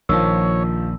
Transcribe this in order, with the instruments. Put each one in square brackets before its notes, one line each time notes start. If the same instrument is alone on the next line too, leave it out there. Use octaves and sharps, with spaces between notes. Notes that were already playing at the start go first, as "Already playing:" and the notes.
[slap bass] A#1 A#2 [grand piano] D#3 F3 [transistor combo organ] C#5 [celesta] E6